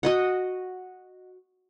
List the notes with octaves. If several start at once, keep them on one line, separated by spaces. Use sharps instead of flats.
F#4 D#5 F#5